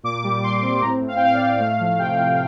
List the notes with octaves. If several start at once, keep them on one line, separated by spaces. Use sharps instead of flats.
A#2 D6
G3
A#2 C6
C4
A2 A#5
A2
F5
G5
A2 F5
D5
A2
A3 F5
F3
C3 G5
F3